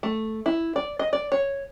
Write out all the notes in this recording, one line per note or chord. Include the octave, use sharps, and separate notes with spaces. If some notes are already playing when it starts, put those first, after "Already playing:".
A3
E4
D5
D#5
D5
C#5